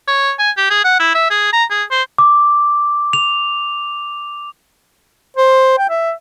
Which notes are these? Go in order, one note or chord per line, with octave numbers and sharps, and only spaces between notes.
C#5
G#5
G4
G#4
F#5
E4
E5
G#4
A#5
G#4
C5
D6
F7
C5
G5
E5